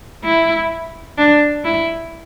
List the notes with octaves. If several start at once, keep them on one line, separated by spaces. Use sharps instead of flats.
E4
D4
E4